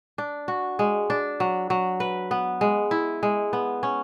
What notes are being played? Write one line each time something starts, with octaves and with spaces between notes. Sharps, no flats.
D4
F#4
G#3
D4
F#3
F#3
B4
B3
G#3
E4
G#3
B3
C#4